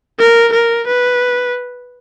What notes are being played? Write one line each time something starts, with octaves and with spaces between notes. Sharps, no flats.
A#4
A#4
B4